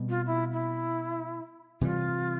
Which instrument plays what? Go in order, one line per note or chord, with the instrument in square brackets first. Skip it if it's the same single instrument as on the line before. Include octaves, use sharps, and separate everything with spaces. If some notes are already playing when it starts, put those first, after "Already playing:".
Already playing: [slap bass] B2 G3 C4
[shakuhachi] F4
E4
E4
[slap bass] C3 E3 G3 [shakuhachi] F4